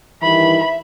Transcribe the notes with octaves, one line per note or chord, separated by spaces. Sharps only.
G2 D#3 E3 E5 B5